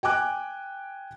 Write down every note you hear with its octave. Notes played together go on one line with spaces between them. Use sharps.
G5 G#5 D6 F#6